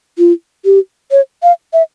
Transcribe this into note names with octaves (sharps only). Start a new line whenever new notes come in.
F4
G4
C#5
F5
E5